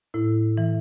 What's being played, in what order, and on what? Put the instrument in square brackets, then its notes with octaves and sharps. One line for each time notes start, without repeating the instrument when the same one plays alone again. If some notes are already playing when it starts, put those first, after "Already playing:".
[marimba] A2 E4
E3